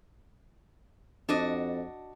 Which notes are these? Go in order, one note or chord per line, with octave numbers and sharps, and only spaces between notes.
F2 D4 F#4 D#5